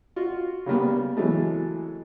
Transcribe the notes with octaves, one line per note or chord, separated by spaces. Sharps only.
F4 F#4
C#3 G3 A#3 B3
E3 F#3 G#3 A3